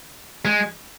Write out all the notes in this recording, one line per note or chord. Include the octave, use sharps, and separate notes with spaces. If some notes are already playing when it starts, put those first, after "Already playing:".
G#3